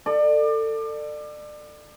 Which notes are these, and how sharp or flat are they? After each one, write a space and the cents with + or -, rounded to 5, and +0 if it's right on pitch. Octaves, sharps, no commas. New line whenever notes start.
A4 +25 D5 +30